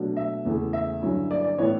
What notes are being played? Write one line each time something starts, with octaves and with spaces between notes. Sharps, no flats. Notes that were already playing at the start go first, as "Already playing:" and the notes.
Already playing: B2 F#3 A3 D4
E5
E2 C#3 E3 A3
E5
G2 D3 F#3 C#4 E4
D5
D5
A2 E3 B3 E4 C#5